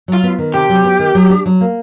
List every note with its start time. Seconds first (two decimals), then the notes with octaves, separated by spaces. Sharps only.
0.08 F#3
0.13 F4
0.23 B3
0.39 D#3
0.54 C3 G4
0.69 F#3
0.84 B3
0.99 D#3
1.15 F#3
1.30 D4
1.46 F#3
1.61 A#3